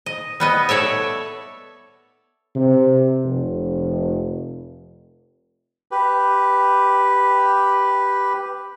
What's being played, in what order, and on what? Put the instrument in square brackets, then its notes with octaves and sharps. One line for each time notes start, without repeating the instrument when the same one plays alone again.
[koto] D#5
G3 B3 D#5
A4 C#5 D5 E5
[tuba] C3
F1
[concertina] G4 B4